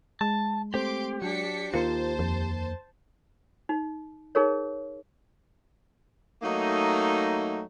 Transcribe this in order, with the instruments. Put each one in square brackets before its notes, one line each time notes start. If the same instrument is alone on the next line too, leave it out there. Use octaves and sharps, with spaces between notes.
[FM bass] G#3 [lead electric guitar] A5
[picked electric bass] A3 C4 [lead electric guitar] G4 [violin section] C6 D6 D7
[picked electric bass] F#3 [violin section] D4 B6 C#7
[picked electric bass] D#2 D#3 A#3 [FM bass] F4 [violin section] C5 A5
[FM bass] F2
[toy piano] D#4
D#4 G#4 A#4 C#5
[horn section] F#3 A3 A#3 D#4